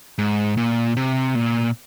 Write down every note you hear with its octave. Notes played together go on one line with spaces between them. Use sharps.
G#2
A#2
C3
A#2